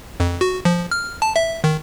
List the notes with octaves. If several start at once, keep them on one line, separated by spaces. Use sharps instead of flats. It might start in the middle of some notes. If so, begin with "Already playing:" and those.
F2
F#4
F3
F6
A5
E5
D#3